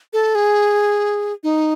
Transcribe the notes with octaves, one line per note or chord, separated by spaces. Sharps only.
A4
G#4
D#4